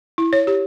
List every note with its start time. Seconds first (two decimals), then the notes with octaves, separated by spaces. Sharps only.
0.18 E4
0.33 C#5
0.47 G4